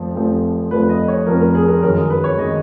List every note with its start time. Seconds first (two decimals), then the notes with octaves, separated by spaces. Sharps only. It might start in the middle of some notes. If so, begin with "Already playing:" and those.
Already playing: F1 F2 F3
0.15 F1 F2 F3
0.71 F1 F2 F3 B4
0.89 D#5
1.08 C#5
1.26 F1 F2 F3 A#4
1.41 A#4
1.55 G#4
1.68 A#4
1.83 F#2 D#3 G#3 A#4
1.97 G#4
2.10 B4
2.24 C#5
2.37 D#3 G#3 D#5